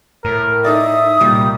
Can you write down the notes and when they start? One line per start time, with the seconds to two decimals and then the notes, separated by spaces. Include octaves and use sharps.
0.24 A2 A#4
0.65 D#4 A4 D5 E5 D#6
1.21 C2 A#2 G3